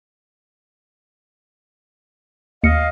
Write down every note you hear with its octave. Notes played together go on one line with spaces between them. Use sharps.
D#2 D#5 F5 C#7